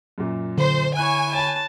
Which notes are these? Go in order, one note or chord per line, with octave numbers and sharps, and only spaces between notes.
F#2 A#2
D3 C5
E4 C#5 G#5 F#6
C#5 A5 B5